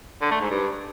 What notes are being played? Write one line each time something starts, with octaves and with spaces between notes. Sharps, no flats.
D3
A3
G#2
G2